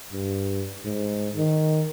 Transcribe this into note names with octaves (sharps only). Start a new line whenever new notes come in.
G2
G#2
D#3